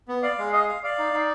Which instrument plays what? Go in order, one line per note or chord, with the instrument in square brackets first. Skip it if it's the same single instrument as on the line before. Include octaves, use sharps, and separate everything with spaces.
[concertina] B3
[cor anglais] D5 [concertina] F5
[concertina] G#3
[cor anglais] D#5 [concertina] F5
[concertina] F5
[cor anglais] D5 [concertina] F5
[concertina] D#4
D#4